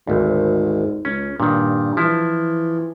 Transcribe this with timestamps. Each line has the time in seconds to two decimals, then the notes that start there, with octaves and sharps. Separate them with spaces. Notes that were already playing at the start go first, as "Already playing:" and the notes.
0.07 G#1 D2 G#2
1.05 C#2 C#4
1.40 G2 A#2 D#3
1.97 E3 F3 E4